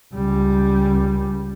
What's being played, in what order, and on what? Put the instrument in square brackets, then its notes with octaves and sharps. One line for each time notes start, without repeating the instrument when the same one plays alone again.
[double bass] C#2 G3